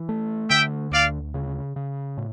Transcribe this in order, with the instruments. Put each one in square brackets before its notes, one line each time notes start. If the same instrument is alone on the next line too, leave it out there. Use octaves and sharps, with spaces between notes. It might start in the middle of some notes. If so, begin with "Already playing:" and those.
Already playing: [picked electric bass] E3
A3
[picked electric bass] D3 [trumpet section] E5 G5
[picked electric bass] D2 [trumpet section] D5 F5
[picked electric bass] C#3
C#3
A2